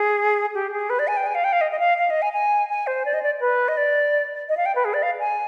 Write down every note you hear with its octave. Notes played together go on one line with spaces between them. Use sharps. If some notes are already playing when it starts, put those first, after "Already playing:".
Already playing: G#4
G4
G#4
B4
D5
G#5
G5
G#5
F5
G5
F5
D#5
D#5
F5
F5
D#5
G#5
G#5
G#5
C5
D5
D#5
D5
B4
D#5
D5
D#5
F5
G5
B4
G#4
D5
F5
G#5